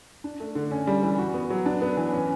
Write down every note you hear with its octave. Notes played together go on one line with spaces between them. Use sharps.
D4
A3
D3
C#4
G3
E3
F#4
B3
F#3
D4
B3
E3
C#4